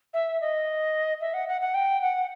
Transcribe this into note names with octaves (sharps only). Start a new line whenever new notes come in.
E5
D#5
E5
F#5
F#5
F#5
G5
F#5